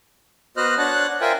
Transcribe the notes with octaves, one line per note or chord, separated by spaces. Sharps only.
B3 F#4 C5 D#5 F6 F#6
D4 C#5 F#5 A5 F#6
F4 A#4 C5 E5 G5 G#5